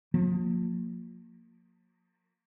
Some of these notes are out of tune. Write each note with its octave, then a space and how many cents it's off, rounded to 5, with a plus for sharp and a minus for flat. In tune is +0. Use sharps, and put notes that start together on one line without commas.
F3 +40 A#3 -15